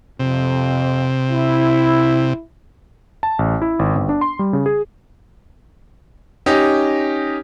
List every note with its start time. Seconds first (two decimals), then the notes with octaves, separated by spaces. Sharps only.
0.19 F2 C3
1.31 E4
3.23 A5
3.39 A1
3.62 E4
3.79 G#1
3.95 G1
4.09 D4
4.21 C6
4.39 G3
4.53 C#3
4.66 G#4
6.46 C#4 D#4 G4 D#5